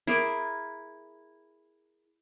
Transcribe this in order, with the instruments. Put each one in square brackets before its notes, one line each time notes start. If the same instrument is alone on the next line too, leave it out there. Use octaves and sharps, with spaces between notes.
[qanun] E4 G#4 A#4 D6